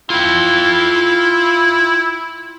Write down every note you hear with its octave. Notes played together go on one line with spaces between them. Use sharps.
E4 F4 G5